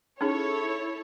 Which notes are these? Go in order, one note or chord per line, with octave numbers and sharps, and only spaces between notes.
C#4 D#4 E4 G#4 A4 C#5